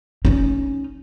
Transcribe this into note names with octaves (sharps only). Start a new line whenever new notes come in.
C#4 D#4